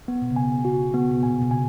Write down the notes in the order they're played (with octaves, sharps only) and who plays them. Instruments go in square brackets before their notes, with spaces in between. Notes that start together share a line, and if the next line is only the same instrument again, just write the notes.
[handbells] B3
[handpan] B2
C#3
[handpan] B2 [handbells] G#5
[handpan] C#3 [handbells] F#4
[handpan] C#3 [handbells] B3
[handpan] B2
[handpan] A#2 [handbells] G#5
[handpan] B2
[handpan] C#3 [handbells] G#5